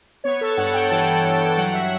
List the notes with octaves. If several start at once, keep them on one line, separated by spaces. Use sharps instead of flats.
B3 C#5
A4
G2 F#5
G5
E3 A5
G5
A5
G2 G5
G5
F#3 F#5
E5